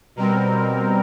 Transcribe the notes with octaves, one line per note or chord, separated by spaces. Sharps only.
B2 G3 C4 A#4